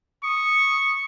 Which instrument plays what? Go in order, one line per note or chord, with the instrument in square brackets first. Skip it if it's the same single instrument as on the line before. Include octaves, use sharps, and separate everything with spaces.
[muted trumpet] C#6 [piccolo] D#6